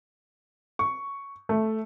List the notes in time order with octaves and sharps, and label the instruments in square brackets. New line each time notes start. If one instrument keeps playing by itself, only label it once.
[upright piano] C#6
A3